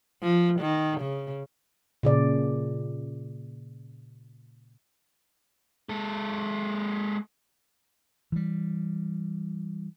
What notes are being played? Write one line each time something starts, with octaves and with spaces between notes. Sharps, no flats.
F3
D#3
C#3
A#2 C#3 D5
G#3 A4
E3 G3